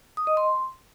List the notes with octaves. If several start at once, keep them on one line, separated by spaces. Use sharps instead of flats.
D#6
D#5
C6